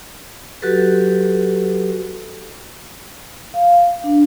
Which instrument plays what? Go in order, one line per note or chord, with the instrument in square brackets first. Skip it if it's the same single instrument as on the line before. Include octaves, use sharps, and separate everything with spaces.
[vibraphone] F#3 F#4 G4 A4 B4
F5
D4